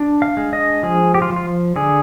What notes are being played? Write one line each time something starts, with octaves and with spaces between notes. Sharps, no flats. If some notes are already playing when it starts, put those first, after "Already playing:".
Already playing: D4
F5
G#3
D#5
F3 G#4
G4
F4
F3
F4
D3 G#4